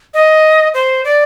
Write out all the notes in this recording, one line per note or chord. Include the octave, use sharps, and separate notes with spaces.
D#5
C5
D5